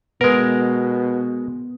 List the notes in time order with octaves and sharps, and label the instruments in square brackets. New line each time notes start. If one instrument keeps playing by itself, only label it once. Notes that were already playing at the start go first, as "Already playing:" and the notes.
[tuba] B2 [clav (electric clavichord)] G#3 A#4 [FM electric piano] B3